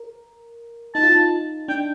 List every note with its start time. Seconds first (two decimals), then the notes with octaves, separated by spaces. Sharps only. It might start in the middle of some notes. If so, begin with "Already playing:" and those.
Already playing: A#4
0.95 D#4 A5
1.03 F4
1.12 D#4
1.68 D4 G5